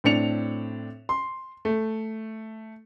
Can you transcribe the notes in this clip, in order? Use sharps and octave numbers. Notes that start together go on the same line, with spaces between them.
A2 C4 D4 C#7 F7
C6
A3